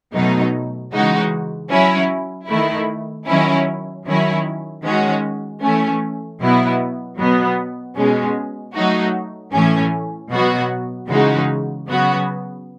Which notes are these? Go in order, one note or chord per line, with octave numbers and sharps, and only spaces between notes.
B2 F#3 A3 D#4
C#3 E3 G#3 D#4 F#4
F#3 C#4 E4
D#3 A3 E4
D#3 F#3 C#4 E4
D#3 F#3 C#4 E4
D#3 G#3 C#4 F#4
E3 A3 C#4
B2 F#3 B3 E4
B2 F#3 B3
B2 G#3 C#4
F#3 A3 D#4 F#4
A2 E3 A3 C#4
B2 F#3 B3 F#4
C#3 E3 G#3 D#4 F#4
C#3 F#3 B3 F#4